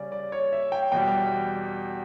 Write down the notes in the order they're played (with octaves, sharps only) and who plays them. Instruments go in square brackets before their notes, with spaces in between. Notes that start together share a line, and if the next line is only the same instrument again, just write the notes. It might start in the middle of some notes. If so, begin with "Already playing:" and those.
Already playing: [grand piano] C#3 G3 C#4 D5
D5
C#5
E5
G5
E2 B2 G3 G5